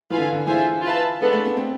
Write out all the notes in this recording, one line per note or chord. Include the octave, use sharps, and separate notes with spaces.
E3 F4 B4 F5 G#5
D3
D3
E3 F4 G#4 C5 E5 G#5
F4 B4 E5 A5
G#3 B3 D4 A4
A3
B3
C4